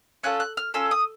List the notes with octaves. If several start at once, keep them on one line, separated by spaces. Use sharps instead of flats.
C#4 F4 A4 F#6
F#6
F6
C#4 F4 A4 E6
D#6